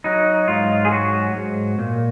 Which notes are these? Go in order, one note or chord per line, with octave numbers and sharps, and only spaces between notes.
F#3 D#4
G#2 F4
G#4
F#3 F#4
G#2
A#2